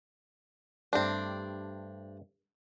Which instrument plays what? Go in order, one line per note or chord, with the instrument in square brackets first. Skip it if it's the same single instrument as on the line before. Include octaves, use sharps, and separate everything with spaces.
[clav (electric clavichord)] G2 A3 G4 [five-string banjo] C4 D4